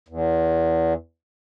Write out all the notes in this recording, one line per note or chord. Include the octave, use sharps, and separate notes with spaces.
E2